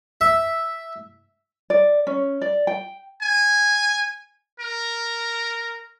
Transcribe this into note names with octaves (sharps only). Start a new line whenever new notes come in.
E5
D5
C#4
D5
G5
G#5
A#4